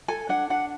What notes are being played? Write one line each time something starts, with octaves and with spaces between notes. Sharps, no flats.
A4 G#5
D4 F#5
D4 F#5